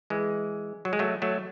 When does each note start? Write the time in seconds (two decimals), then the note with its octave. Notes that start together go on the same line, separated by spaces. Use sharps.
0.10 E3 G#3
0.85 F#3
0.93 G#3
0.99 F#3 A3
1.22 F#3 A3